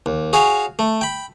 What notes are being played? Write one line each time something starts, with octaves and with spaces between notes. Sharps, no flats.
D#2
F#4 G#4 C#5 F5 G#5
A3
G5 B5